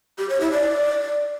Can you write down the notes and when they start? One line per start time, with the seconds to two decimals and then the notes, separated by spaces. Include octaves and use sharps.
0.18 G4
0.29 C#5
0.41 E4
0.52 D5